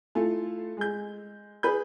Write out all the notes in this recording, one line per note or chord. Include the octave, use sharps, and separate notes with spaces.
A3 E4 F4 A4
G#3 G6
G#4 B4 B5 G6